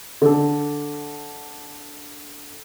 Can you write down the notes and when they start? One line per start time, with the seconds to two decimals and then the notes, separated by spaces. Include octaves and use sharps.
0.22 D3 A4